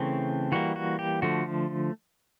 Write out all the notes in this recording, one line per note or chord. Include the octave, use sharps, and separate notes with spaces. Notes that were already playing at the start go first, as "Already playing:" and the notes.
Already playing: C#3 E3 A3 C4
E3 G3 A#3 F#4
F#4
G4
D3 F3 A3 F#4